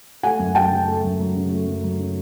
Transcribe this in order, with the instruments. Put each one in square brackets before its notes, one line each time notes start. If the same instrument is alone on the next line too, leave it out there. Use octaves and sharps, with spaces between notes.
[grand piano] A3 [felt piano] F#5 G#5
[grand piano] F#2
[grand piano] F#3 [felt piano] G5 A5
[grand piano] C#3
A3
F#2
F#3
C#3
A3
F#2
F#3
C#3